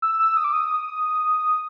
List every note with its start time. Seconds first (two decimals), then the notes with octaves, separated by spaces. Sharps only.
0.02 E6
0.19 E6
0.37 D#6
0.44 D6
0.53 D#6